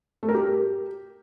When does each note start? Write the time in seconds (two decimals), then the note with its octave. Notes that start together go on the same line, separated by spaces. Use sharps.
0.23 A3
0.29 A#4
0.35 G4